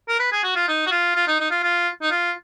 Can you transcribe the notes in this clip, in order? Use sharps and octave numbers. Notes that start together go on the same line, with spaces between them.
A#4
B4
G#4
F#4
F4
D#4
F#4
F4
F4
D#4
D#4
F4
F4
D#4
F4